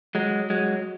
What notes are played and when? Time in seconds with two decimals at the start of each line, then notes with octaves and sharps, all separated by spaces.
0.15 F#3 G#3
0.50 F#3 G#3